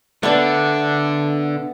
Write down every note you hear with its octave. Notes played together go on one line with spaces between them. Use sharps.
D3 A3 B3 D4 D5